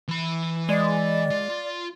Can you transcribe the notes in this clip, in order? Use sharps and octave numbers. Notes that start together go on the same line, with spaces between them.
E3 B5
G#3 D5
F4